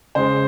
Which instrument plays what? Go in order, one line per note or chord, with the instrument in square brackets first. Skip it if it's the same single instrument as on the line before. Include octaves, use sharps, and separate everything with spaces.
[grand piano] C#3 G#3 C5